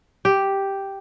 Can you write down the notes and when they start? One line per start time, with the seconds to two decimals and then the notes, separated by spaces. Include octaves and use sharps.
0.25 G4